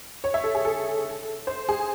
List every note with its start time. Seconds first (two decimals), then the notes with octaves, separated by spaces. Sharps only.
0.24 C#5
0.34 E5
0.44 A4
0.55 G#4
0.65 A4
1.47 C5
1.69 G#4